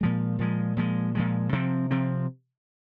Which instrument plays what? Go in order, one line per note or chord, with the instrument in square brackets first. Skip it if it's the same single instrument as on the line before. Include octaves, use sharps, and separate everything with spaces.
[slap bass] A#2 F3 G#3
A#2 F3 G#3
A#2 F3 G#3
A#2 F3 G#3
C3 F3 C4
C3 F3 C4